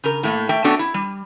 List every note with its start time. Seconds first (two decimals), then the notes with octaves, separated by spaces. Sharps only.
0.04 C#3 A#4
0.23 A2 A3 A#3
0.49 A3 E5 G5 A5
0.64 A3 B3 C#4 D4 F#4 A4
0.79 E4
0.94 G3